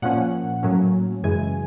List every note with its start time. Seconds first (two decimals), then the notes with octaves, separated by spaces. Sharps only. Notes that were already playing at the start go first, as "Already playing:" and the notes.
0.02 A#2 F3 A#3 C#4 F#5
0.63 A2 F#3 A#3 C#4
1.23 F#2 C#3 E3 G#3 G#5